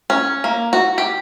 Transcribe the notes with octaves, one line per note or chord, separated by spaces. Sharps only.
C#4
A#3
F#4
G4